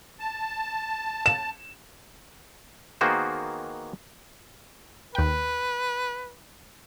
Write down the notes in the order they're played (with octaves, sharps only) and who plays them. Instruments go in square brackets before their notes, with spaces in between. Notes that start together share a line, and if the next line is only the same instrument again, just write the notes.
[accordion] A5
[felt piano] E7
[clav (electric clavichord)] D#3 A#3 B3 F#4 G#4 C5
[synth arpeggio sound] D#2 G5 [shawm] B4